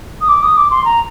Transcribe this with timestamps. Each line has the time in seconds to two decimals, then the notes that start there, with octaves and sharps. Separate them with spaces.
0.21 D#6
0.28 D6
0.42 D#6
0.56 D6
0.70 C6
0.84 A#5